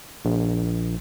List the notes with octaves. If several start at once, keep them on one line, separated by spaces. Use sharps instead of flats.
A#1